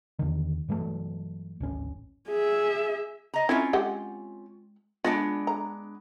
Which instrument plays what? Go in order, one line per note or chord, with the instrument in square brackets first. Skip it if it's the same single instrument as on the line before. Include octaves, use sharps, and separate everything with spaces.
[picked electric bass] E2 D3 D#3
G2 E3 F#3 A3
D1 G#1 C#4
[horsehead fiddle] G#4 E5
[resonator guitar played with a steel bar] D#5 A#5
[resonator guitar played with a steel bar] C4 C#4 F4 [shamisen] E4
[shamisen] G#3 G4 F#5
[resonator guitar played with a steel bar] G#3 B3 D4 [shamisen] F4
[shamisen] A#5